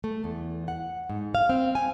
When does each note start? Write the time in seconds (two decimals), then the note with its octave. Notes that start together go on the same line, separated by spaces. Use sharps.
0.04 A3
0.24 E2
0.68 F#5
1.10 G#2
1.35 F5
1.49 C4
1.75 G#5